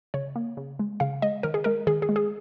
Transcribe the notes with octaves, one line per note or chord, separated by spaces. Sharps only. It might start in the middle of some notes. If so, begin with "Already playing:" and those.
C#3 C#5
A#3
C#3
G#3
C#3 F5
G#3 D#5
D#3 A#4
G#4
G#3 A#4
D#3 G#4
G#4
G#3
G#4